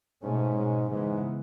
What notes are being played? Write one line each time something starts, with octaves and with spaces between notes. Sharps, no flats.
G#2 B2 A3 C#4
B2 G#3 C#4
G#2 C#3 E3 G#3 B3